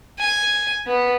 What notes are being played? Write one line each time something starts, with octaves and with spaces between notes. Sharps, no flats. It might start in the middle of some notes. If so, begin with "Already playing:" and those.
G#5
B3